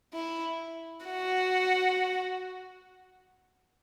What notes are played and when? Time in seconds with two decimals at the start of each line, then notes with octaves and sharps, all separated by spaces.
0.14 E4
1.06 F#4